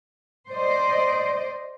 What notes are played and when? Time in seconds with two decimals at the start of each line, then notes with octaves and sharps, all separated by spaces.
0.51 C5 D5 D#5